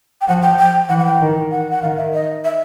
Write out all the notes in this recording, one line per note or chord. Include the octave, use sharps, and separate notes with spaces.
G5
F3 F#5
G5
G5
E3 F#5
F#5
G5
D#3
F#5
F#5
D#3 F5
E5
D#5
E5